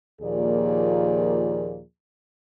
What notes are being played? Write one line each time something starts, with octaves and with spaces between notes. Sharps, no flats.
D#2 A#2 F3 A#3 G#4 D5